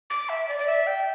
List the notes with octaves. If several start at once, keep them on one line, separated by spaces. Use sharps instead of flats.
D6
E5
D5
D5
E5
G5